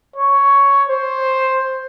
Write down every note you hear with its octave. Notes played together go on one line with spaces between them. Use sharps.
C#5
C5